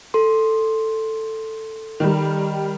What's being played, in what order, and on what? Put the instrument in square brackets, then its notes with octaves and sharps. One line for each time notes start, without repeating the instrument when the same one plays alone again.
[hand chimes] A4 C6
[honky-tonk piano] D#3 G3